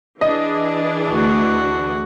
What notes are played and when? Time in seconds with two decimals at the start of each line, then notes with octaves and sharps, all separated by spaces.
0.21 E3 D4 G#4 D#5
1.12 D2 F#4